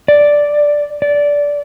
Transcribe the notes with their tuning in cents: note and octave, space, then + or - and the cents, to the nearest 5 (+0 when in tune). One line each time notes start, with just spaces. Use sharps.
D5 +0
D5 -15